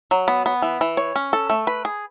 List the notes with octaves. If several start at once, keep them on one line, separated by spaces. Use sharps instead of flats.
F#3
B3
B3
E3
E3
C#5
C#4
A4
A3
B4
G#4